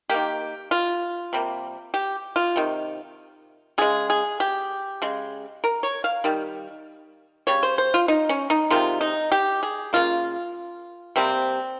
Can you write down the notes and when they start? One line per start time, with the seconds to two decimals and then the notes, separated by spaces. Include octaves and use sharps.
0.10 D#3 A#3 G4
0.71 F4
1.33 C3 G3 A#3
1.94 G4
2.36 F4
2.56 C3 D#3
3.78 C#3 G#3 G#4
4.10 G#4
4.40 G4
5.02 C#3 G#3
5.64 A#4
5.83 C#5
6.04 F5
6.24 D#3 G3
7.47 C#3 G3 C#5
7.63 C5
7.78 C5
7.94 F4
8.08 D#4
8.29 C#4
8.50 D#4
8.70 C3 D#3 G#3 F4
9.01 D#4
9.32 G4
9.63 G#4
9.93 C#3 G3 A#3 F4
11.16 C3 G3 A#3 C4